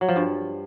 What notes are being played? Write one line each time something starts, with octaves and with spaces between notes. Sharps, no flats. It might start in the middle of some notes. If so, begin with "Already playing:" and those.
F#3
F3
G2